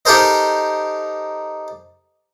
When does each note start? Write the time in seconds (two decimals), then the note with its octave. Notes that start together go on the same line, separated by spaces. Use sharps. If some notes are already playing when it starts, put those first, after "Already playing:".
0.05 D#4 G4 A4 A#4 C5 D#5